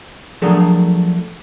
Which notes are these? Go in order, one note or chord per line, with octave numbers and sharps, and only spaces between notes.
F3 F#3 A3 D4 G#4 A#4